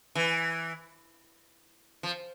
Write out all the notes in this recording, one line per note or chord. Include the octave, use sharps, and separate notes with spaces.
E3
F3